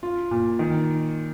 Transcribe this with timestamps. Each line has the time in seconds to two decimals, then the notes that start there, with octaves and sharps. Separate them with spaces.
0.03 F4
0.31 A#2
0.59 D#3